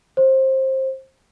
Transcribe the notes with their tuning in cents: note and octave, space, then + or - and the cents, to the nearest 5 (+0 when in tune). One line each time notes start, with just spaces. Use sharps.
C5 +20